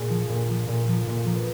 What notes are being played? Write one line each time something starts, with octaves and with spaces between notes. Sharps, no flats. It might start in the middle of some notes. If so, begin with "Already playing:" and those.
Already playing: A#2 G#4
F3
A#2
F3
A#2
F3
A#2
F3 A#4
B4